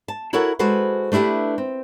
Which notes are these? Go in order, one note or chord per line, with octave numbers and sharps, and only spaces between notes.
A5
E4 F#4 A4 A#4 C#5 F#5
G#3 F#4 A4 B4 C5 F#5
A3 D4 E4 G4 B4
C4